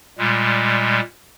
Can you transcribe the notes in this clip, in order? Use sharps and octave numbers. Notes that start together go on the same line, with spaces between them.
A#2 G3 G#3